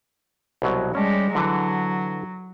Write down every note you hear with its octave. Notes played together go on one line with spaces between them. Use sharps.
C2 B2 F#3
G3 G#3 C#4 A5
D3 E3 F#3